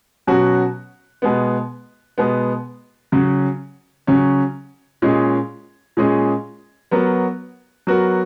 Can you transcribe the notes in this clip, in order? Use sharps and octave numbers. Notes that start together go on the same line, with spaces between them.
B2 F#3 C#4 F#4
B2 G#3 B3
B2 G#3 B3
C#3 F#3 C#4
C#3 F#3 C#4
A#2 G#3 C#4 G#4 D#5
A#2 G#3 C#4 G#4 D#5
F#3 B3 F#4 A#4
F#3 B3 F#4 A#4